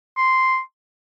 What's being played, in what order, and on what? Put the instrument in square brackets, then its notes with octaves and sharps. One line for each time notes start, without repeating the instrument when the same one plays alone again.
[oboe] C6